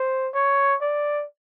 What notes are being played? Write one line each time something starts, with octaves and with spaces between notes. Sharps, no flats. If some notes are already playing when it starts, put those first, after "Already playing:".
Already playing: C5
C#5
D5